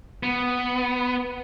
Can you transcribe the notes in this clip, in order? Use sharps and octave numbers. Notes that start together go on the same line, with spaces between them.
B3